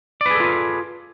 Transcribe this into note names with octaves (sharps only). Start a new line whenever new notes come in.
F4 G#4 A4 B4 D5